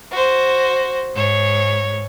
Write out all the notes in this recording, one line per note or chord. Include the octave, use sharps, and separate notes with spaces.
F#4 C5
G#2 C#5